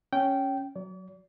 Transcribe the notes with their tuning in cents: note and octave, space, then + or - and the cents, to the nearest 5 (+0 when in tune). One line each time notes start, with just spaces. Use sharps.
C#4 +0 G5 -15
F#3 +0 D5 -45